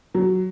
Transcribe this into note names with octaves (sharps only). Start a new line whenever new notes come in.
F#3